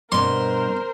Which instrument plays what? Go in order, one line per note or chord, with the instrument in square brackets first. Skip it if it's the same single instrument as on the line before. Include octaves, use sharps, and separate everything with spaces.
[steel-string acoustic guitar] G2 B2 [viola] A#4 C5 [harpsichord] C6